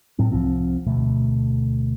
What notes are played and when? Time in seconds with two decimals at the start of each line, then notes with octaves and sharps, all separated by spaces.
0.19 A2 F#3 C4
0.32 C2 F3 C4
0.86 D2 B2 A3